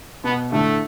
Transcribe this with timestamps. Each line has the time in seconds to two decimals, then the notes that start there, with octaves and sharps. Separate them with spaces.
0.24 B2 B3
0.52 A2 D3 A3